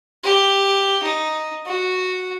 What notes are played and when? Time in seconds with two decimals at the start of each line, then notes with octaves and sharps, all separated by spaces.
0.23 G4
1.03 D#4
1.66 F#4